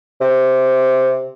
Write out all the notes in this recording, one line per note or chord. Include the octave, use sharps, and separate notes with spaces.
C3